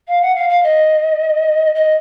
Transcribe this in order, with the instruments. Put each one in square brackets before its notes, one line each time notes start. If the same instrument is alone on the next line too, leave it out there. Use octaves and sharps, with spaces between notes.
[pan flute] F5
F#5
F5
F5
D#5
D#5